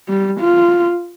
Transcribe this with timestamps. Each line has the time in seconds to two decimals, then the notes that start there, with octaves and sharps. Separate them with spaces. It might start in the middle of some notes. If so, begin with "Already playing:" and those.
0.08 G3
0.40 F4